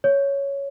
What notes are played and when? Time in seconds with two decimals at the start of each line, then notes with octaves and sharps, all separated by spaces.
0.04 C#5